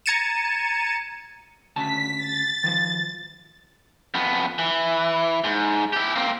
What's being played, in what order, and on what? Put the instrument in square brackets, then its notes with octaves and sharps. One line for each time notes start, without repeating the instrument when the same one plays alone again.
[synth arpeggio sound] A#5 G#6 A6 C#7 D#7 E7
[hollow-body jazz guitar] D2 C#3 A5 [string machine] B6
[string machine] A6
[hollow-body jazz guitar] D#3 F3
[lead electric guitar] F2 B3
E3
G#2
E4 G4
A#3 C4